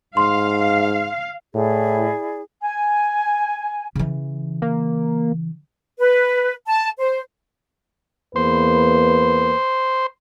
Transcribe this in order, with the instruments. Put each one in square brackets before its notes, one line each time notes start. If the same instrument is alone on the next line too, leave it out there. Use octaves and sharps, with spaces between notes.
[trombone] G#2 [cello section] F5 [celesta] C6
[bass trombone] A2 [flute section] E4 G#4 D5
[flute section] G#5
[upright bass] C#3 E3
[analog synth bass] A#3
[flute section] B4
A5
C5
[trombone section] E2 A#3 B4 [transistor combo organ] C5